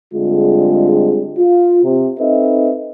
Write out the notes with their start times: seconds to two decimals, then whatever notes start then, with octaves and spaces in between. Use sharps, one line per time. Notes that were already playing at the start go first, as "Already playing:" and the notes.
0.14 D3 G3 G#3 C4 F4 G#4
1.38 F4
1.84 C3
2.20 C4 D#4 A4 B4 D#5 E5